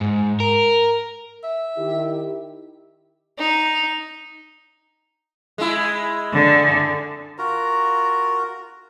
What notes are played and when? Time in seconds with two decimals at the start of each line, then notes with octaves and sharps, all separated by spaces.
0.01 G#2
0.40 A#4
1.44 E5
1.77 D#3 E4 G4
3.38 D#4
5.58 G#3 E4
6.32 D3
7.38 F4 F#4 A#4 A#5